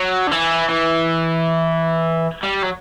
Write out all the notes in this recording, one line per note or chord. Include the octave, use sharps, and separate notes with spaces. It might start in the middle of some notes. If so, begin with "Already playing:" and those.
Already playing: F#3
D3
E3
E3
G3
F#3